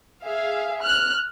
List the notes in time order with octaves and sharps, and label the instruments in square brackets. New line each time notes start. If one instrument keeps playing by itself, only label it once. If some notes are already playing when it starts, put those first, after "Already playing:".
[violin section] G#4 E5 F5
F6 F#6